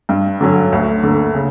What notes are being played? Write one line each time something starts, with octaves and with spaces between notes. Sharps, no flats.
G2
D3 F#3 C#4
D2
D3 A#3
C#3